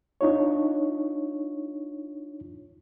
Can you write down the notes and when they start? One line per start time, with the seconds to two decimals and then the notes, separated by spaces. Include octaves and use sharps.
0.21 D4 D#4 F4 C#5